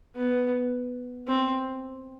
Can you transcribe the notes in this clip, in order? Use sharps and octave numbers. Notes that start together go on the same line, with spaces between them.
B3
C4